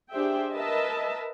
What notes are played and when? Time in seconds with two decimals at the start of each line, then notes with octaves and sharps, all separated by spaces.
0.12 D4 G4 G#4 C5 E5 G5
0.53 A#4 B4 D#5 E5 A5